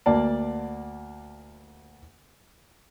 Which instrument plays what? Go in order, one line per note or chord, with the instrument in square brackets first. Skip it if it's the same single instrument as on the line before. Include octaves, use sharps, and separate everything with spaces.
[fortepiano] D2 A#3 D5 A5